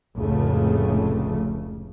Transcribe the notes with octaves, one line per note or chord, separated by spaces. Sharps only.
F1 C#2 A2 C#3 A3